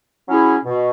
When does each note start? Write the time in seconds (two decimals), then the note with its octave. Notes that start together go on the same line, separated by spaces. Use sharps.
0.28 F#3 C#4 E4 G#4
0.65 B2